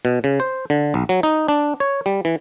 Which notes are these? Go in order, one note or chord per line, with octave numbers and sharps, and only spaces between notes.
B2
C#3
C5
D3
B1
F#3
D#4
D4
C#5
G3
E3